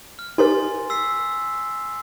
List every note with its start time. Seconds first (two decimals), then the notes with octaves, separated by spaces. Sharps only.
0.19 F6
0.38 D#4 G4 A#4 G#5 C6 A6
0.90 E6 B6 C7